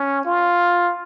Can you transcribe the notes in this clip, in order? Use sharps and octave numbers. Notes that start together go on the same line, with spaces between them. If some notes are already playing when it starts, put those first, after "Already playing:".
Already playing: C#4
F4